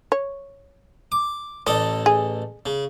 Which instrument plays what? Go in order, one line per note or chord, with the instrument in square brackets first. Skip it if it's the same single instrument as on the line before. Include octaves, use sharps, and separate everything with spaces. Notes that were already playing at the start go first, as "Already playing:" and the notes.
[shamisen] C#5
[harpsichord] D6
[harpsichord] A1 A4 D#5 [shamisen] D5
[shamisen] G#4
[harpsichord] C#3